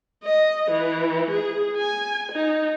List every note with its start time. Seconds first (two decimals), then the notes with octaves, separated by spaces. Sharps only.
0.24 D#5
0.71 E3
1.31 G#4
1.77 G#5
2.32 D#4